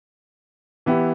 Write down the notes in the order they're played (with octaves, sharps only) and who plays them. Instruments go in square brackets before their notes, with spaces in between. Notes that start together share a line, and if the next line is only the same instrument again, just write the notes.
[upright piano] E3 B3 E4 G4